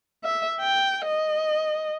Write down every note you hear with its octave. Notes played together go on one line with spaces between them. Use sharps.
E5
G5
D#5